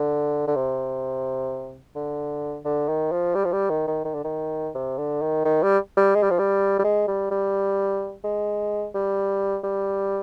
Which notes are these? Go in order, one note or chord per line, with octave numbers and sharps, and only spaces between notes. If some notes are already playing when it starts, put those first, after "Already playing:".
Already playing: D3
D3
C3
D3
D3
D#3
F3
G3
F3
G3
D#3
D#3
D#3
D3
D#3
C3
D3
D#3
D#3
G3
G3
G#3
G3
F3
G3
G3
G#3
G3
G3
G#3
G3
G3